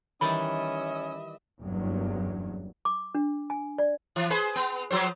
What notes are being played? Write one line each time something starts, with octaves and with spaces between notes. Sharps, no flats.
D#3 E3 G3 C#4 D#5 E5 B5
F#1 E2 G2 F#3
D6
D4
G#5
D5
E3
G#4 B4 C5
B3
F3 F#3 C5